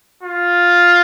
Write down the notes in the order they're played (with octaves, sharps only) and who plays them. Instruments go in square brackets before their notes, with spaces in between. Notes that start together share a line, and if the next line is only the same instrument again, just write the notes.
[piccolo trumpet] F4